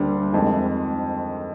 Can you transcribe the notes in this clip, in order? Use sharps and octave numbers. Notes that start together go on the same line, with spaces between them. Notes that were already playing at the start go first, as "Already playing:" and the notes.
Already playing: D2 D3 G3 A#3 D4
F2 D#3 G#3